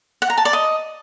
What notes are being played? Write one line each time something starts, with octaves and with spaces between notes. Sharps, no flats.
F#5
A#5
A5
D5
D#5